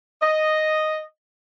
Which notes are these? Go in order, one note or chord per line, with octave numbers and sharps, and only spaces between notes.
D#5